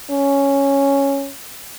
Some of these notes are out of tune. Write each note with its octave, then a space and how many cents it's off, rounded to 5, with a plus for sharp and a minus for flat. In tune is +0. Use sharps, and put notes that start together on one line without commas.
C#4 +0